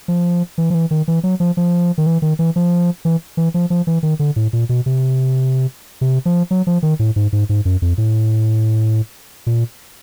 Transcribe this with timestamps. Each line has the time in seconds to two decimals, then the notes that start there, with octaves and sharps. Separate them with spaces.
0.08 F3
0.58 E3
0.70 F3
0.74 E3
0.91 D#3
1.08 E3
1.23 F#3
1.40 F3
1.57 F3
1.98 D#3
2.06 E3
2.22 D#3
2.39 E3
2.56 F3
3.05 E3
3.37 E3
3.54 F3
3.70 F3
3.87 E3
4.03 D#3
4.19 D3
4.36 A2
4.53 A#2
4.69 B2
4.86 C3
6.01 C3
6.26 F3
6.51 F#3
6.67 F3
6.83 D#3
6.99 A2
7.16 G#2
7.33 G#2
7.49 G#2
7.65 F#2
7.82 F2
7.98 A2
9.47 A#2